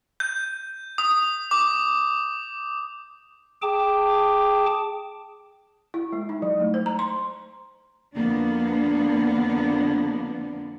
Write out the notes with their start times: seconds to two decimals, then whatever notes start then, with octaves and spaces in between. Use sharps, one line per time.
0.20 G6
0.98 D#6
1.51 D6
3.62 G#4 G5 A5 D6
5.94 E4
6.12 G#3
6.29 D#4
6.42 F#3
6.60 A3
6.74 C5
6.86 A#5
6.99 C6
8.15 F2 D3 A#3 B3 D4